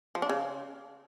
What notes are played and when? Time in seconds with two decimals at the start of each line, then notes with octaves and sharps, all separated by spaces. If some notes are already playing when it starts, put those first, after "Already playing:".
0.15 F3
0.22 D4
0.29 C#3